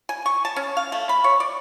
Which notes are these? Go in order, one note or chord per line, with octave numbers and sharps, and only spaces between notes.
G#5
C#6
A5
C#4
F5
A3
B5
C#5
D5